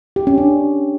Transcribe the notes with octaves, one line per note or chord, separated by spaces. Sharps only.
G4
C#4
D4